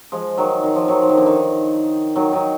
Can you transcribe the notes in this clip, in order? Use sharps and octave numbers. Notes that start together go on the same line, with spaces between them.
F3 G#3
D#3 F#3
D#3
F3
D#3 F#3
F3
D#3
D3
D#3
D#3 F#3
D#3 F#3